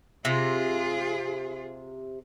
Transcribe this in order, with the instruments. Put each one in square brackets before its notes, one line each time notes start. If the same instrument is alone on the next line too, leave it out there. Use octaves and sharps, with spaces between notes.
[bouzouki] C3 [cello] F4 G#4